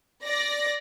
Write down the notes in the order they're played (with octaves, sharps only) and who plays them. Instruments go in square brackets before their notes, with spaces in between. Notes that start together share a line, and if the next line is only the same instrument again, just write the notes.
[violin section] D5 A#6